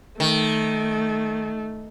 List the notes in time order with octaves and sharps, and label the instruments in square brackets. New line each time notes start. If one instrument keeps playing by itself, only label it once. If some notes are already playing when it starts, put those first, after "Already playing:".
[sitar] D#3 [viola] A3